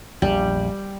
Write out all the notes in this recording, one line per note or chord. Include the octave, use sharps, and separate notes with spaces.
A#1 E2 G3